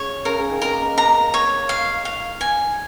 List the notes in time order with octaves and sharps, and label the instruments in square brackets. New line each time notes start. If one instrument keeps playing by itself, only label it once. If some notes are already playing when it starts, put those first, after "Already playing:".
Already playing: [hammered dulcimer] C#3 [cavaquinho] C#5
[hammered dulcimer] C#3 [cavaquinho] A#4
[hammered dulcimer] C#3
D#3
[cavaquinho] A#4
[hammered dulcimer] A#3
[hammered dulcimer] A#3 [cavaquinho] A#5
[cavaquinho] C#5
F5
F5
G#5